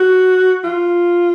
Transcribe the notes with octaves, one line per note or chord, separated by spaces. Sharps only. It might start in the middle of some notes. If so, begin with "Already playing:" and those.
Already playing: F#4
F4